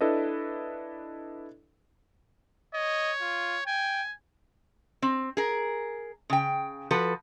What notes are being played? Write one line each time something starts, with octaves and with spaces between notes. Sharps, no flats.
D4 E4 A4 B4 D#5
C#5 D#5
F4
G5 G#5
C4
G#4 A#4
C#3 G5
F3 F#4 A4 B4